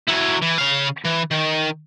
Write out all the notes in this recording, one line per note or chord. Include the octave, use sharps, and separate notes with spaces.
F#3 E4
E3
C#3 F5
E3
D#3